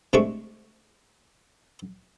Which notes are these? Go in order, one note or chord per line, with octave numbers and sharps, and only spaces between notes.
C3 G#3 A3 D4 C#6